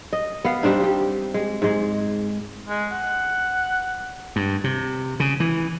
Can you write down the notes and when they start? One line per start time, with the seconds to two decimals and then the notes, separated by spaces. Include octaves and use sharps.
0.13 D#5
0.45 B3 F5
0.63 G3 C4 D4 D#4
0.80 G3 G4
1.34 G#3
1.62 G#2 G#3
2.69 G#3
2.92 F#5
4.36 G2
4.64 C3
5.20 C#3
5.40 E3